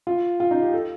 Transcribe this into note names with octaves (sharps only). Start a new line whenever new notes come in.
F4
F4
D#4
G4
A4